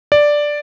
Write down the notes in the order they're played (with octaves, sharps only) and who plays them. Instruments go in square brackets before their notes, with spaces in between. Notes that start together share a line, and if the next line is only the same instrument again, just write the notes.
[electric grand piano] D5